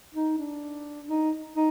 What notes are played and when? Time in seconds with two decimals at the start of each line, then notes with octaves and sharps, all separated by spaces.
0.15 D#4
0.38 D4
1.09 D#4
1.56 D#4